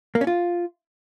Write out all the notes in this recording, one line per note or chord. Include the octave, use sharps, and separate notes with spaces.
A#3
C#4
F4